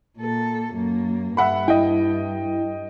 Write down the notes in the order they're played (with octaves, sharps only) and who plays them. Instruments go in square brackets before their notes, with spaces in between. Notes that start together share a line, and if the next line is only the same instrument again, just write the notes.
[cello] A#2 A4
F#2 A#3
[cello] G2 [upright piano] E5 F#5 B5
[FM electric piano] E4 [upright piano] D#5 G5